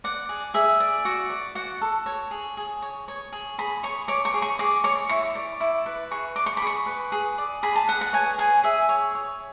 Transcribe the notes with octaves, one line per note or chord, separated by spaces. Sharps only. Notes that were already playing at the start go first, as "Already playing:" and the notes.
D5 F#5
G#4
G#4 E5
D5
F#4
D5
F#4 F#5
A4
C#5
G#4
G#4
C#5
C#5
G#4
G#4 B5
C#5 C#6
C#5 D6
C#6
G#4
C#6
G#4 D6
C#5 C#6
E4 C#6
D5
E4
B4
G#4 C#6
D5 D6
C#6
B5
G#4 C#6
B4
G#4
D5
G#4 B5
A5
B4 F#5
F#5
C#5 G#5
G#4 G#5
G#4 E5
C#5
C#5